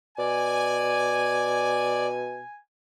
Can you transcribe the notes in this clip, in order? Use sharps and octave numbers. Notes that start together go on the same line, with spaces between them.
B2 D5 G#5